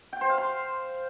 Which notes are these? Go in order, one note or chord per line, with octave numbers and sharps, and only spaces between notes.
G5
C5
F5
C6